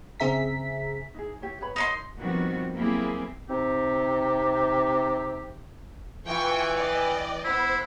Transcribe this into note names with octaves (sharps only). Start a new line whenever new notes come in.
C#3 C4 G#4 E5 A#5 B6
D#4 E4 G#4
E4 G4 C#5
B4 C#5 B5
D#4 A#4 C#5 D#5 B5 C6
D#3 F3 G3 B3 C4 F#4
F#3 A#3 C4 E4 G4 G#4
C3 C4 D#4 G4
E3 F4 E5 G5 G#5 C#6
D5 D#5 G5
B3 E4 C5 B5